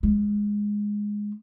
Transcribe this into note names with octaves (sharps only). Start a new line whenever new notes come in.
G#3